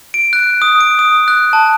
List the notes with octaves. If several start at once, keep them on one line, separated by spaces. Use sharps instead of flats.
D7
F#6
D#6
D7
D#6
F#6
A5